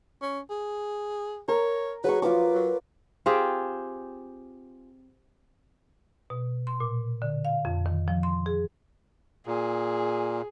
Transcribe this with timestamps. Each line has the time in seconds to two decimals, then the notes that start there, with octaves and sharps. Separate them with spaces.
0.22 C#4
0.50 G#4
1.48 A#4 C#5
2.04 F#3 G#4 B4 C#6
2.22 F3 F4 B4 D6
2.53 F#3
3.26 C4 F4 G4 G#4
6.30 B2
6.67 C6
6.80 A#2
7.22 D3
7.45 F5
7.65 F2
7.86 D#3
8.08 F3
8.23 C6
8.46 G#4
9.46 A#2 G#4